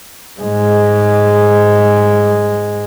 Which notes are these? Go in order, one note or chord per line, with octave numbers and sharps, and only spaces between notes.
G#2 G#3